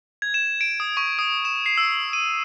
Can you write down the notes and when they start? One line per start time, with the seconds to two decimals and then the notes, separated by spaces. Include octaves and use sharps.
0.22 G#6
0.34 E7
0.61 D7
0.80 D#6
0.97 C#6
1.19 D#6
1.45 E7
1.66 C7
1.78 E6
2.13 D#7